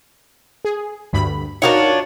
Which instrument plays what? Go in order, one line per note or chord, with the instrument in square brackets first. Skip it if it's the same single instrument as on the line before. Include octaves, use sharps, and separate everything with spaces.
[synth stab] G#4
D2 G2 B5
[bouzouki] D4 F4 C#5 [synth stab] D#4 F#4 A#4